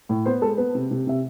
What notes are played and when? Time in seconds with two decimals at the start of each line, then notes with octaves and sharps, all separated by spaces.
0.09 A2
0.26 B3 C5
0.42 G#3 A4
0.58 B3 B4
0.75 C3
0.91 C3
1.07 C3 E5